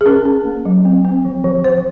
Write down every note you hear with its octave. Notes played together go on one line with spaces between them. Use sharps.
G#4
C#4 A#4
C#4
A#3
F#3
C4
C4
F3
F3
F3 C5